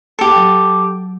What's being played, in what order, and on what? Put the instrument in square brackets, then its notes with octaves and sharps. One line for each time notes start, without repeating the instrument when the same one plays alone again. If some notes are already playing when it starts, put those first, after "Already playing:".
[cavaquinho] G4 A4
[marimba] F#3